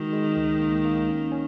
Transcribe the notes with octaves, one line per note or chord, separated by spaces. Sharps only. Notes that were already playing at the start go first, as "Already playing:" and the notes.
Already playing: D#3 G#3 F#4
G#3
C#2
A#3
A#3
C#4
C#4